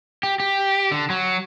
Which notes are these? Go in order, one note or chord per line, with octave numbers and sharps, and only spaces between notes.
G4
G4
D3
F#3